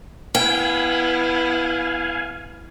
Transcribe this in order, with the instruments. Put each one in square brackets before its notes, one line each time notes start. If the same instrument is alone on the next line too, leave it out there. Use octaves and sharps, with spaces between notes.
[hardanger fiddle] B3 E4 [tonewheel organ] F5 G#5 [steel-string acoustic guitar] G5